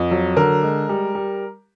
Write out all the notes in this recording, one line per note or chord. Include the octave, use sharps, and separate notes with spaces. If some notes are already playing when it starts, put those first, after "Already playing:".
Already playing: F2
F#3
D3 A#4
G#3
G3
G3